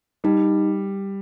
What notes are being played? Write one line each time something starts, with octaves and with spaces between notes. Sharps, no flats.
G3 D#4